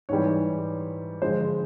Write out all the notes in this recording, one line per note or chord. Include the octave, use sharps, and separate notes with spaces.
G#2 E3 G3 C#5
G2 D3 F3 G#3 C5